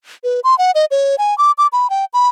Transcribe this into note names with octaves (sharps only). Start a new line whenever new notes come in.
B4
C6
F#5
D#5
C#5
G#5
D6
D6
B5
G5
B5